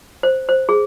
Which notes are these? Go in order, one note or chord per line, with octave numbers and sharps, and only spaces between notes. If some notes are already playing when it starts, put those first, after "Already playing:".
C5
C5
G#4